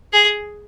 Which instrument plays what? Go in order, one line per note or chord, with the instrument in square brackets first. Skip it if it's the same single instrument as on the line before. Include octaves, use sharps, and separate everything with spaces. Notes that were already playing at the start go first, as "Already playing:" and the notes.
[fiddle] G#4